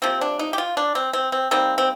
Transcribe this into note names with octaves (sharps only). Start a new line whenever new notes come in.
C3 F3 A#3 C4
D4
D#4
G4
F4
D4
C4
C4
C4
D#3 G3 A#3 C4
C4